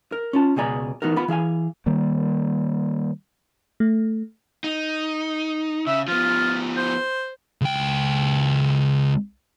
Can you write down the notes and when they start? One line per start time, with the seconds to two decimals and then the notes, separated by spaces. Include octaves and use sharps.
0.12 A#4
0.33 C#4 F4 A5
0.56 C#2 B2 G#4 D5 A#5
1.02 E3 B3 D#4 F#4 A#4
1.16 B3 F4 B5
1.28 E3 G#4 F5 G#5
1.86 D#3 G3 A#3
3.80 A3
4.64 D#4
5.87 C#3 E5
6.08 F3 B3 F4
6.77 C5
7.61 C#2 G5